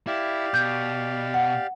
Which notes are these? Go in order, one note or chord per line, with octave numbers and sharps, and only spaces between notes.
E4 G4 D5 F5
B2 G6
F#5